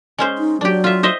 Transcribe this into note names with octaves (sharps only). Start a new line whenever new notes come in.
G#3 C#4 C5
D#4
F#3 D4 G4
F4 E5
C5 D#5 E5